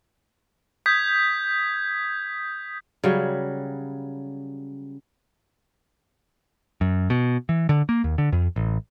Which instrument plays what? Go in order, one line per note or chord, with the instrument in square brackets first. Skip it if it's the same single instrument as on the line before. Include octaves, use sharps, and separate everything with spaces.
[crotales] D#6 G6 G#6 B6
[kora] C#3 F#3 G3
[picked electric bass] F#2
B2
E3
D3
A#3
D#2
D3
F2
A1